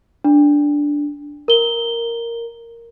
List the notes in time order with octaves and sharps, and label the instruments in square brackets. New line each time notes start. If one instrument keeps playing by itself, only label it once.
[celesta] D4
A#4 G7